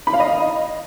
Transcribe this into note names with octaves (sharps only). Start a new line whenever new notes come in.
B5
F5
D#5